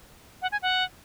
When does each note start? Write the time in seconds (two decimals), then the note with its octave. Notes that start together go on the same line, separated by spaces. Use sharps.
0.42 F#5
0.52 G#5
0.62 F#5